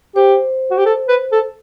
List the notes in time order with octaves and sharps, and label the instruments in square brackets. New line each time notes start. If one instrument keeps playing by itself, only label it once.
[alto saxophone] G4 [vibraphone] C5
[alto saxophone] F#4
G4
A4
B4
A4